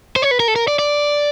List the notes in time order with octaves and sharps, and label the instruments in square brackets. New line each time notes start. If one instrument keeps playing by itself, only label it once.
[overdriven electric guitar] C5
C#5
B4
A#4
A4
A#4
D5
D5